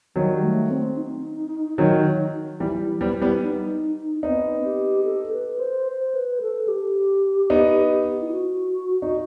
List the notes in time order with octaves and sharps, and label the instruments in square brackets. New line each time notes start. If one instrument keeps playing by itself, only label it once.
[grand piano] D#3 F#3 [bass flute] G3
[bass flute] A3
C4
D#4
[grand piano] D#3 F#3
[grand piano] E3 G3 [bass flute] E4
[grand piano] G3 B3
G3 B3
[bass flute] D#4
[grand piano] B3 D#4 [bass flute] C4
[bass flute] G4
A4
B4
C5
C5
B4
A4
G4
[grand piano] B3 D#4
[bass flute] E4
F#4
[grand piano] D#4